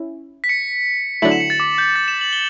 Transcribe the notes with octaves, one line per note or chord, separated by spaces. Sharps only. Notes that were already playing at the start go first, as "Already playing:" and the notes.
Already playing: C#4 E4
B6
C#7
D3 F#3 A3 E4 F#7
E7
C#7
A6
D6
G6
A6
E7
F#7
G7